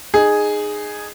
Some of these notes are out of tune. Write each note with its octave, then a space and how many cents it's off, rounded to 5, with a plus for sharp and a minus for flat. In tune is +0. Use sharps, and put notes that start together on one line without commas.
D#4 -20 G#4 +0